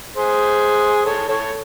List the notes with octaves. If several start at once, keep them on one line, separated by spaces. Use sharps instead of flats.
G#4 C5
A4 C#5
A4 C#5